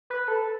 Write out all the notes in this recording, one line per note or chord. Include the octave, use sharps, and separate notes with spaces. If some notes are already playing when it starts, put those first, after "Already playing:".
B4
A4